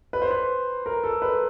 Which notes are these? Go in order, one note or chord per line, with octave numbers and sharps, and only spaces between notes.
B4
C5
B4
A#4
A4
B4